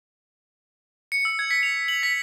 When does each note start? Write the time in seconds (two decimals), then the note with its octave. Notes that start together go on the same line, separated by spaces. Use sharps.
1.12 C#7
1.25 E6
1.39 G#6
1.51 B6
1.63 F7
1.88 F#7
2.03 B6